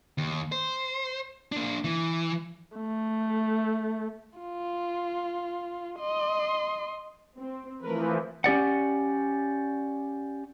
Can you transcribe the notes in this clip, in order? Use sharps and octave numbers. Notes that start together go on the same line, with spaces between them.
D#2
C5
A#3 D4
E3
A3
F4
D#5 C6
C4
E3 F3 A3 A#4 B4
C#4 G4 D5 F#5